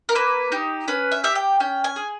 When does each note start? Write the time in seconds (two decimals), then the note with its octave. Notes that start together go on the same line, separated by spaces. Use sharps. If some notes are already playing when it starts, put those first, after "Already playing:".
0.09 A#4
0.15 A#3 B4
0.52 D#4 G4
0.88 C#4 B4
1.12 E5
1.24 G4 E5
1.35 G5
1.60 C#4 G5
1.84 G#5
1.96 G#4